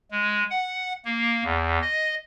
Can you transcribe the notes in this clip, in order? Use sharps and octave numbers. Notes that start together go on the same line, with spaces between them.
G#3
F#5
A#3
E2
D#5